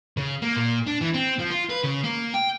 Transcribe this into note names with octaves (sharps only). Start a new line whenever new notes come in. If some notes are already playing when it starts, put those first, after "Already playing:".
C#3
A#3
A#2
D4
E3
C4
F3
F4
B4
C#3
A#3
G5